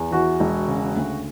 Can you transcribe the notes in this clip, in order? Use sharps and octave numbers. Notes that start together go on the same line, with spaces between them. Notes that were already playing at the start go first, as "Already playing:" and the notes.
Already playing: E2
E3 F#4
E1
C#3
D2